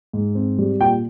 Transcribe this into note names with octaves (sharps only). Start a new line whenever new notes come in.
G#2
C4
G3
A#2 G5